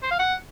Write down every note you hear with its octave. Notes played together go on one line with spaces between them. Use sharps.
C5
F5
F#5